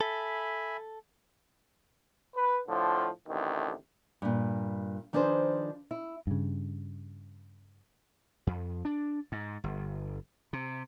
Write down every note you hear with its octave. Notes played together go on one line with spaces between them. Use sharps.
A4 E5 G#5 B5
B4
A2 D3 F3
A1 D2 C3 D#3
G2 A#2
D#3 F3 D4 G#4 B4 C5
E4
G2 C#3
F2
D4
G#2
G1
C3